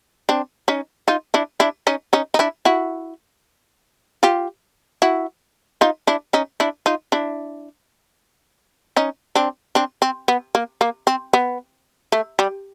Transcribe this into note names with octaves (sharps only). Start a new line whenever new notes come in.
C4 D4
C#4 D#4
D#4 F4
D4 E4
D4 E4
C#4 D#4
C#4 D#4
D#4
D4 E4
E4 F#4
F4 G4
E4 F#4
D#4 F4
D4 E4
C#4 D#4
D4 E4
D#4 F4
D4 E4
C#4 D#4
C4 D4
C4 D4
C4
B3
A#3
A#3
C4
B3
A3
G3